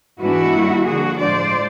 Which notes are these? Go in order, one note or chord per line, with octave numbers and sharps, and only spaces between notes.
G#2 E3 G#3 B3 D4 E4 F#4
G2 D#3 G3 A#3
D3 F3 A#3 D4 F#4 G#4
A2 F3 G#3 C5 D5